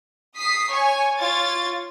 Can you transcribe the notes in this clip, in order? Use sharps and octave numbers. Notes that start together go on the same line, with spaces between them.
D#6 B6 C7
C#5 G#5 C#6
F4 C#5 G#6 A6